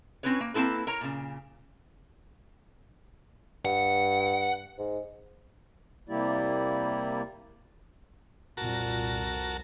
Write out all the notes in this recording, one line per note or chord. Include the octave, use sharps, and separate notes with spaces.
C4 C#4 E4 B4 C#5
A#3
A#3 C4 E4 A4 B4
A#4 C#5 A#5
A#2 C#3
G2 F#5
G#2
C3 G3 A#3 E4 G4 D5
C2 F2 A#2 F#4 A#4 A5